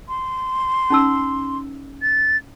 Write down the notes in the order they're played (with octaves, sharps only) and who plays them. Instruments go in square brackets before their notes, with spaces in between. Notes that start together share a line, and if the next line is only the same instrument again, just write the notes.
[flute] C6
[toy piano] C#4 D#4 E6
[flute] A6